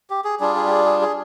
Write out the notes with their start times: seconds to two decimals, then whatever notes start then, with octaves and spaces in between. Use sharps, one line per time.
0.10 G4
0.24 G#4
0.40 G3 D4 F4 G#4
0.56 G#4
0.66 G4
0.70 G#4
0.86 G#4
1.02 G#4